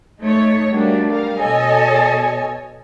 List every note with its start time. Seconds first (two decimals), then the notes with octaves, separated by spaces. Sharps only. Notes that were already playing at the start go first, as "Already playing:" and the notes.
0.21 A3 D#4 C#5
0.72 G3 A3 A#3 D4 F#4
1.10 G3 A#4 F5
1.40 B2 A4 C#5 D#5 G#5